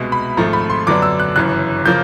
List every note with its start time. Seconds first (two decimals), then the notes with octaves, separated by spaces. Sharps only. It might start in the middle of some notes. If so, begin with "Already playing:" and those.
Already playing: C2 B2 G#3
0.12 B5
0.37 G#1 G#2 F3 A3 A#5
0.53 B5
0.70 C6
0.87 F#2 D3 F#3 B3 D4 D6
1.02 E6
1.20 F#6
1.36 G1 F#2 C#3 E3 F#6
1.86 C#3 F3 A#3 G6